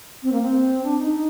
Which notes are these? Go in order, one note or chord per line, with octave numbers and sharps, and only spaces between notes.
C4
A#3
C4
D4
D#4
D#4